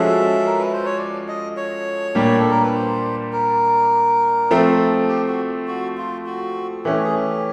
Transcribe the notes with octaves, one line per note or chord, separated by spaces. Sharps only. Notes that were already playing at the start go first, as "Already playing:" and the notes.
Already playing: F3 G#3 C#4 F#4 A4 E5
A#4
B4
C5
C#5
D5
D#5
C#5
A#2 G3 A#3 D4 G4
A4
A#4
B4
C5
A#4
F3 A3 C4
G4
F#4
F#4
F4
F#4
E3 A3 C#4 G4
G#4
G4